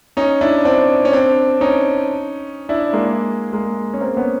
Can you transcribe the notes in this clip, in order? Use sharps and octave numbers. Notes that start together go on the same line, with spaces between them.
C#4 D#4
D4 E4
C4 D4
C#4
C4 D4
C#4 D#4
D4 E4
G#3 A#3
G#3 A#3
C#4
A#3 C4
B3 C#4